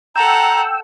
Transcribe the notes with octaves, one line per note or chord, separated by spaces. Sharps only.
A4 F#5 G5 A#5 E6